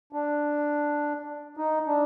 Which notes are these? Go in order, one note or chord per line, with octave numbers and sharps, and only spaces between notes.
D4
D#4
D4